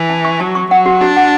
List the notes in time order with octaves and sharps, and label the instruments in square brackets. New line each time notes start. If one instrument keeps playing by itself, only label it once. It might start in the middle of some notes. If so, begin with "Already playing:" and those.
Already playing: [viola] E3
[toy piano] A5
C#6
[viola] F#3 [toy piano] A5
[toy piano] C#6
[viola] F#3 [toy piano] F#5
[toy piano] F#4
[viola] D4 [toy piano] F#4
[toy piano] F#5